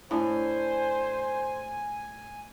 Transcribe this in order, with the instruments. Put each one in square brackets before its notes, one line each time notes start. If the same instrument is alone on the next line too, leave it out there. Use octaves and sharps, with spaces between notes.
[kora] A2 [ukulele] D4 [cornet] C5 [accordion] G#5